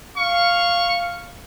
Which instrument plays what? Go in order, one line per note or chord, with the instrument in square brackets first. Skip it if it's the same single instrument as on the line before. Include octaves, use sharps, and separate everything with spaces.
[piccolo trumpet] F5 [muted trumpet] C#6